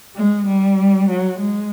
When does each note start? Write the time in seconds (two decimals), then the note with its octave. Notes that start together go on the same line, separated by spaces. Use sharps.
0.16 G#3
0.46 G3
1.09 F#3
1.40 G#3